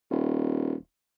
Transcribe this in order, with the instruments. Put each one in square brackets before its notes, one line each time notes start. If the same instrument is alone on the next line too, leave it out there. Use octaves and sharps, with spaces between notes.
[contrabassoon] D#1